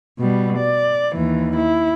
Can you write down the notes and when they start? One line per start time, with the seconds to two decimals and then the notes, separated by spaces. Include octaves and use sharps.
0.19 B2 G3
0.58 D5
1.15 D#2 E3
1.56 E4